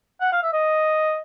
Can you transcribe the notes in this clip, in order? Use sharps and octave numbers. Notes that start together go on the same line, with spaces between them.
F#5
F5
E5
D#5